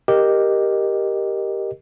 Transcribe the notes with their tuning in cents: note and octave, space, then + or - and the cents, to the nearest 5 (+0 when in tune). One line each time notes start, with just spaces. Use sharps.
G4 +0 A#4 +0 D#5 -10